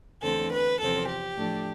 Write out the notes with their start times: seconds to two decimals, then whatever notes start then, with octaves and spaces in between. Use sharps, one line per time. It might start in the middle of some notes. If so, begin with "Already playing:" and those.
0.23 E2 D3 A3 C4 A4
0.52 B4
0.80 E2 C3 F3 C4 A4
1.08 G4
1.36 A2 F3 A3 D4